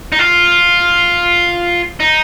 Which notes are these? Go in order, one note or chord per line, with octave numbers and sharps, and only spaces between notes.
D#4
F4
D#4